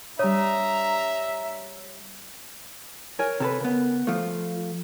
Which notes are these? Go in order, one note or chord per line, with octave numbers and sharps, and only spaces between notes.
G3 D4 C#5 E5 A#5 D#6
A#4 C#5 G#5
C3 A4 B4
C#3 B3
F3 A3 F4